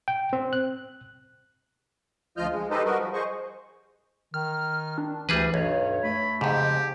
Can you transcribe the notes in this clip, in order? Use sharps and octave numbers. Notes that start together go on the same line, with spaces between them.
G5
C4
F#6
D2 F3 F4 D#5 F6 G6
G#3
D#4 G4 A4 B4 C5 D#5
G3 F#4 A#4 B4 D#5
F3
G#4 C5 D#5 C#6
D#3 F6
D4
D2 E3 G3 G#4 B4
B1 G2 C#5
A3 B5
F2 G#2 C#3 G4